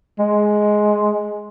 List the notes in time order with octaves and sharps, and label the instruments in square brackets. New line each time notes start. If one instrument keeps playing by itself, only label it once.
[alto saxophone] G#3